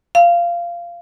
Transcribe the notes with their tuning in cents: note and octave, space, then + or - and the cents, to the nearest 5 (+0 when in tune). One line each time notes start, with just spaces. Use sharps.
F5 -15